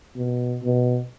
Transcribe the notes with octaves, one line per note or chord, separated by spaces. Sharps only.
B2
B2